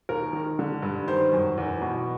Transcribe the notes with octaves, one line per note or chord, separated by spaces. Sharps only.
D#2 A#4
D#3
D3
G2
D#3 C5
F#2
E2
B2